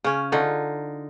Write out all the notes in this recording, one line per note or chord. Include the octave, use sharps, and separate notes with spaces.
C#3 C#4
D3 D#4 F4